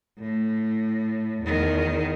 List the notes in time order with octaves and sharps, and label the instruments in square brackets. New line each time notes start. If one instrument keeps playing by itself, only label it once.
[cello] A2
E2 D#3